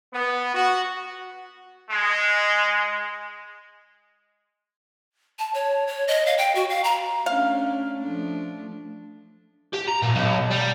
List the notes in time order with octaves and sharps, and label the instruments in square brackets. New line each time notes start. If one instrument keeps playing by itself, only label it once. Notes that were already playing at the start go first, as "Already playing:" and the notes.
[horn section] B3
F#4
[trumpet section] G#3
[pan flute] A5
C#5
C#5
D#5
F5
G5
F#4
F5
A#5
[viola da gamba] A3 C#4 D4 [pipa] F5
[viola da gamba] F3 A3 D4
[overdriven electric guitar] G4
A#5
A#2
B1
G3